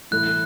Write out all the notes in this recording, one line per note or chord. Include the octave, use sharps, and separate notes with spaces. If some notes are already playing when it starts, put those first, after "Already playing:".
A2 E3 A3 E4 F#6